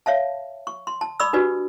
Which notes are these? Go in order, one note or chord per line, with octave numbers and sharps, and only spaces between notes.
C#5 E5 F5 A5
C#6
C6
A5
D5 B5 C#6 D#6 E6
D4 F#4 G4 B4 D5